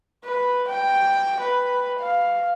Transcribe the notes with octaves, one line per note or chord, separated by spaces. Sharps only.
B4
G5
B4
F5